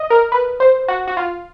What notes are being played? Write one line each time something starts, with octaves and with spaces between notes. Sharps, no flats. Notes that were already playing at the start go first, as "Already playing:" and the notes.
Already playing: D#5
A#4
B4
C5
F#4
F#4
F4